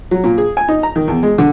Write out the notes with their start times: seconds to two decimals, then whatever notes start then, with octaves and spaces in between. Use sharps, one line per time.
0.11 F#3
0.24 A#2
0.38 G#4
0.57 G#5
0.68 D#4
0.83 A#5
0.96 D#3
1.08 E2
1.23 G#3
1.38 D3